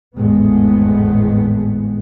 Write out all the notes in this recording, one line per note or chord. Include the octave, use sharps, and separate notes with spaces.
G#1 E2 A2 G#3 B3